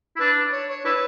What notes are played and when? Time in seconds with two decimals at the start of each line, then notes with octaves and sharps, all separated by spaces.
0.16 E4
0.20 D4 B4
0.52 C#5
0.69 C#5
0.84 D4 E4 B4